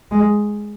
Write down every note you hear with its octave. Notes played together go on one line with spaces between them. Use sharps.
G#3